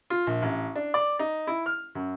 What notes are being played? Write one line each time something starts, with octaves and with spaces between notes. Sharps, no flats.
F4
A#1
A1
D4
D5
D#4
E4
F6
F#2